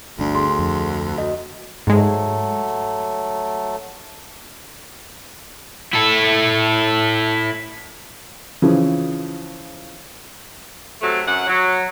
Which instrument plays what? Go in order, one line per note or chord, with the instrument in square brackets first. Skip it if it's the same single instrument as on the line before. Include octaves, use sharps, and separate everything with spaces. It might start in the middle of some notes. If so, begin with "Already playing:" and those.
[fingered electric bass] G1 D4 [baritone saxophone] D2
[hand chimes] G#4 C6
[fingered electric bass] F2
[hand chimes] F#4 D#5
[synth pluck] G#2 G#3 [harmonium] F#3 A3 A4
[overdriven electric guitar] E4 A4
[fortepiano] C#3 E3 F3
[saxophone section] C3 F#3 A3
F#2 F#5
F#3